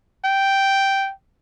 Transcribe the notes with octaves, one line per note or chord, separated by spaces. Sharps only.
G5